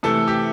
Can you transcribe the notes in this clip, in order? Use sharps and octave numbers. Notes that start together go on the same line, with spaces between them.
C3 E3 A3 A4
G4